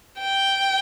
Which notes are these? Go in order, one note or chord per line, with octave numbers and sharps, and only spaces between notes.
G5